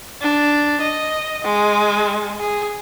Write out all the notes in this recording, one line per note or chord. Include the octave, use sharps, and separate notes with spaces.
D4
D#5
G#3
G#4